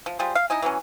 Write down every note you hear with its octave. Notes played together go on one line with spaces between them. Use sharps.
F3
G3 F4 G#4 C5
F5
D#4 E4 D#5 G#5
E3 F#3 B3 C#4